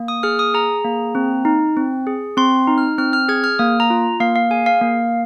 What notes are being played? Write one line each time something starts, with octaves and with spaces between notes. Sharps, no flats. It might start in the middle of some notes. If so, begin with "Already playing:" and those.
Already playing: A#3
D#6
G#4 F6
D#6
G#4 A#5
A#3
C4
D#4
C4
G#4
C4 C6
D#4
F6
C4 F6
F6
G#4 G#6
F6
A#3 D#6
A#5
F4
A#3 F5
F5
G#4 G#5
F5
A#3